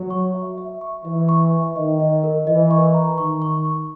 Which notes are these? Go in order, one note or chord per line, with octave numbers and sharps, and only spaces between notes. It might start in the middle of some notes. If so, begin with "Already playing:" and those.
Already playing: F#3
C#6
E5
E5
C#6
E3 E5
C#6
E5
D#3 D#5
D#5
A#4
E3 D#5
C#6
A#5
D#3 C#6
C#6
C#6